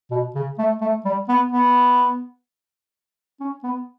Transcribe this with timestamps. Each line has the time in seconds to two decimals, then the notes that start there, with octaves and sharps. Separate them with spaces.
0.11 B2
0.35 C#3
0.58 A3
0.81 A3
1.05 G3
1.28 B3
1.52 B3
3.40 C#4
3.63 B3